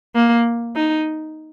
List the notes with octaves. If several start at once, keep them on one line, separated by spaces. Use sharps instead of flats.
A#3
D#4